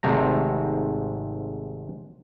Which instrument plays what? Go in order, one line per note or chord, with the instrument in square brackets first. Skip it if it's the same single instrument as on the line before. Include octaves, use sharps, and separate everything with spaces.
[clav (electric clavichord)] G#1 G#2 C3 A3 A#5